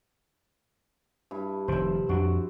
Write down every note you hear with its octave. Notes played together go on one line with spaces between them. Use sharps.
G2 E4
F1 D#3 C5 E5
F2 D4 F#4